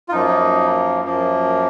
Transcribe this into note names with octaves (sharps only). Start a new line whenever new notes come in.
F4
F#2 F3 A#3 D#4
F#2 F3 A#3